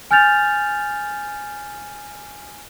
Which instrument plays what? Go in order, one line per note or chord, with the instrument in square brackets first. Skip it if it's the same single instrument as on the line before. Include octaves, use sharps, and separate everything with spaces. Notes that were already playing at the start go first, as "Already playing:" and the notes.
[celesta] G#5 F6 G6 A6 F7